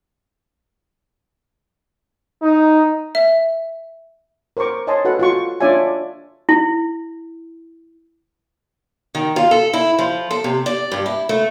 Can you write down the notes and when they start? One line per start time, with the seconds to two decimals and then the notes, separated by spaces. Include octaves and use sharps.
2.42 D#4
3.15 E5
4.57 A#4 C5 A#5 C#6 D6
4.87 C#5 D#5 G#5 A5 C6
5.05 F#4 A4 B4 F#5
5.19 F4 F#4 C#6
5.60 D4 F4 C#5 D5 E5 G#5
6.49 E4
9.15 D#3
9.36 F4
9.51 A4
9.73 E4
9.99 F3
10.31 A4
10.44 C3
10.66 D5
10.92 G2
11.06 E4
11.29 A3